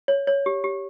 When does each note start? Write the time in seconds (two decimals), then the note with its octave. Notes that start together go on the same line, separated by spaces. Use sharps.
0.08 C#5
0.27 C#5
0.46 G4
0.64 G4